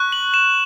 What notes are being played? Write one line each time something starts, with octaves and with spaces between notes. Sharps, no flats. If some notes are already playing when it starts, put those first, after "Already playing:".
Already playing: C#6 F#6
F#7
E7